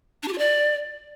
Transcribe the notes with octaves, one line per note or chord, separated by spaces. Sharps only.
D4
G4
F4
D5